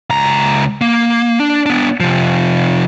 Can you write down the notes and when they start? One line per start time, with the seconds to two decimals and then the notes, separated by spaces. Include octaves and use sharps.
0.10 C#2 A#5
0.81 A#3
1.40 D4
1.66 B3 D4
2.00 C3 F3